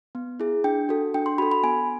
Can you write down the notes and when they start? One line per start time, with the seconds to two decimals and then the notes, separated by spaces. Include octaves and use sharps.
0.15 B3
0.40 E4 G#4
0.64 D4 G5
0.89 F#4 A4
1.14 D4 G5
1.26 C6
1.38 F#4 A4 B5
1.51 B5
1.63 B3 G#5